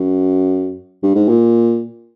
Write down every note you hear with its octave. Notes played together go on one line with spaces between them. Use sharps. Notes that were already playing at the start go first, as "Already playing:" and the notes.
Already playing: F#2
G2
G#2
A#2